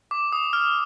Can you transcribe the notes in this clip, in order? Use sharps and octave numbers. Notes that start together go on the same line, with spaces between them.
D6
D#6
F6